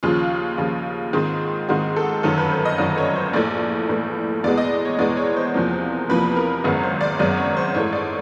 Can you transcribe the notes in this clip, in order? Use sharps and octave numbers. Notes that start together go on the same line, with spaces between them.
D#2 C#3 F3 F4
D#2 C#3 F3
G#2 D#3 G#3 C4
G#2 D#3 G#3 C4 F#4
A4
G1 F#2 D#3 F#3 A4
B4
C5
D#5
G1 F#2 D#3 F#3 D5
C#5
C5
A#1 A2 E3 A3 D5
A#1 A2 E3 A3
E2 B2 G#3 B3 D5
D#5
C#5
E2 B2 G#3 B3 D5
C#5
C5
E2 C3 F3 A#3
E2 C3 F3 A#3 B4
A#4
G#1 F#2 C#3 F#3 B3
C5
D5
G#1 F#2 C#3 F#3 B3 D5
C#5
C5
G#2 E3 A3 C#5
D5